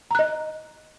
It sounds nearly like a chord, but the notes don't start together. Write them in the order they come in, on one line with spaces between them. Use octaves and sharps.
A#5 F#6 D#5